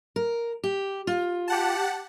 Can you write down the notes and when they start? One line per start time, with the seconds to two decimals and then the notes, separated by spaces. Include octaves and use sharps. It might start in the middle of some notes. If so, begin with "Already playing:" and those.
0.16 A#4
0.64 G4
1.07 F4
1.48 G4 F#5 A5